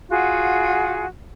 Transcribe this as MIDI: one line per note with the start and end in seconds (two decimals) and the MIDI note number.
0.09 1.05 65
0.09 1.05 66
0.09 1.05 68
0.09 1.05 78